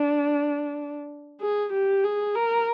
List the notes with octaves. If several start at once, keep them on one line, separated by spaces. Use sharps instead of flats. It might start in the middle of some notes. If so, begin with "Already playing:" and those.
Already playing: D4
G#4
G4
G#4
A#4